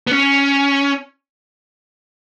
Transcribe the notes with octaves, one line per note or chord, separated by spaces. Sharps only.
B3
C#4